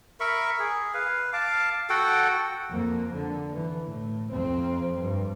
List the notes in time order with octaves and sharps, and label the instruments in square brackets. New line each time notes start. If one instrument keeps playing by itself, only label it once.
[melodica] A#4 E5 B5 C#6
G#4
B4 F5
F5 A5 D6
F#4 A4 F#5 G5
[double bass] F2 A#3
D3
E3
A2
F2 C4
G2